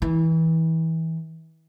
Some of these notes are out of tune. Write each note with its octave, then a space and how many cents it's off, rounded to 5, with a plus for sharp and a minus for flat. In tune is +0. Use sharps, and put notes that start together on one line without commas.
E3 -25 E4 -35